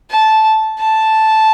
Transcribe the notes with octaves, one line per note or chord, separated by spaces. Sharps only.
A5
A5